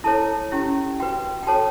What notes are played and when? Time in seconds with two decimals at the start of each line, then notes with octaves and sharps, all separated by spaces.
0.04 E4 A4 C#5 A5
0.52 C#4 E4 G4
1.00 F#4 B4 G5
1.43 G5
1.47 F#4 A4 C#5 A5